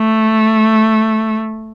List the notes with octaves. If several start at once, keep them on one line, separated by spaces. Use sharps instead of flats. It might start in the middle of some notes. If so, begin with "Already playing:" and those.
Already playing: A3